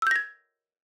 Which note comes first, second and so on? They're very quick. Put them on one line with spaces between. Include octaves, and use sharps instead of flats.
E6 G6 A#6 G#6